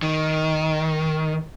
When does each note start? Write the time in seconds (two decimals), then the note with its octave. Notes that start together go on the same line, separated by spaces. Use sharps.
0.02 D#3